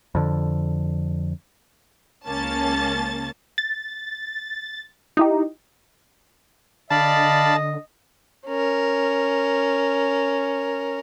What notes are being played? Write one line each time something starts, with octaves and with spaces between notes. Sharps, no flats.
F2 D3
C#2 A#3 C#4 A5 A6
A6
D#4 E4 G4
D3 D5 D#5 F5 A5 B5
C#4 A#4